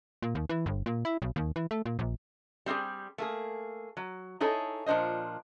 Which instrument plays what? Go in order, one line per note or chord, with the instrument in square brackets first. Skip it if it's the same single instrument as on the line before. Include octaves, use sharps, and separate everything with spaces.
[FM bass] A#2
D#2
E3
G1
A#2
E4
B1
D#2
E3
A3
A#2
A#1
[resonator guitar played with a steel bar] G3 C4 E4 G4 G#4
A3 A#3 G#4
F#3
D#4 E4 G#4 A4 C#5
A#2 F3 D4 C5 D#5